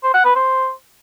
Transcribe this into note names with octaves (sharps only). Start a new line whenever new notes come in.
C5
F#5
B4
C5